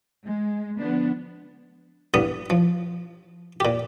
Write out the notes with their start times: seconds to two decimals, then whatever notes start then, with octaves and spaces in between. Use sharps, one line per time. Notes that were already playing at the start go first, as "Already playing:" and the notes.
0.23 G#3
0.80 D3 F3 B3 D4
2.14 A1 G2 B3 D#6
2.50 F3
3.60 A#2 G4